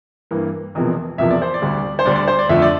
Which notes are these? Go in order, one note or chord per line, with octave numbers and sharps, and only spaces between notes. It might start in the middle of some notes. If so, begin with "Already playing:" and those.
G2 E3 A#3
E1 E2 C3 F3 A#3
E1 E2 C3 F3 A#3 E5
D5
C5
D5
D2 D3 G3
C5
D2 D3 G3 D5
D5
C5
D5
F2 D3 F3 A3 E5
D5